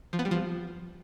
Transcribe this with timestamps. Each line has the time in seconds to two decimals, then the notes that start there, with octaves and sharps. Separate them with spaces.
0.13 F3
0.19 B3
0.25 G3
0.31 F3